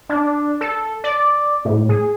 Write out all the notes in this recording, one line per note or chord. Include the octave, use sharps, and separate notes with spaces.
D4
A4
D5
A2
G#4